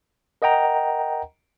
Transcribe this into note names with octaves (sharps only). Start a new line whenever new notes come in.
A#4 D#5 F#5 G5 A#5